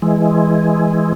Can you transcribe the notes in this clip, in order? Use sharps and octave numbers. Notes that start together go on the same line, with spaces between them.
E3 G#3